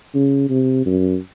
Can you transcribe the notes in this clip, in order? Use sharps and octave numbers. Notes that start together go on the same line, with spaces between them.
C#3
C3
F#2